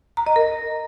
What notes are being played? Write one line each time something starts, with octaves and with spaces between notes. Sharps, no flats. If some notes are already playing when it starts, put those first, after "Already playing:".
A#5
D#5
A#4